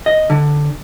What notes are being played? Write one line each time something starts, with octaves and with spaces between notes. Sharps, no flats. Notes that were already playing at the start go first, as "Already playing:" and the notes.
D#5
D3